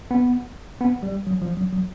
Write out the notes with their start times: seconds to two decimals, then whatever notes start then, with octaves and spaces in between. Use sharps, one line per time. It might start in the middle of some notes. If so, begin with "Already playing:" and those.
0.11 B3
0.81 B3
1.03 G3
1.27 F#3
1.42 F3
1.57 F#3
1.73 F#3